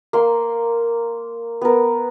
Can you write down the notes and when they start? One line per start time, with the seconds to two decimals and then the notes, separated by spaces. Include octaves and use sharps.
0.13 A#3 C6
1.62 B3 A#4